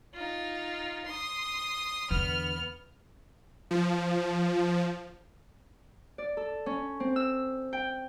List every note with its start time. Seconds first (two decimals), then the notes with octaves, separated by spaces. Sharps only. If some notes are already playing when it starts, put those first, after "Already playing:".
0.15 D#4 F4
1.06 C6 D#6
2.11 E2 D3 B3 F6
3.71 F3
6.18 D5
6.37 A4
6.66 C#4
7.00 C4
7.16 E6
7.73 G5